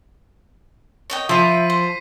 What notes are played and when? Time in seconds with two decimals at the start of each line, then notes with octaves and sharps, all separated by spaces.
1.10 C#5 D#5 G5
1.29 F3 E5 B5 B6 C7 D#7
1.70 C5